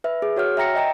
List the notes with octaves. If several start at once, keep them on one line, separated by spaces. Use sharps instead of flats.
B4 E5
G#4
F#4 C#5 F#5 F6
E5 G5 A#5 A#6 C#7
D5 D#5 G5 A#5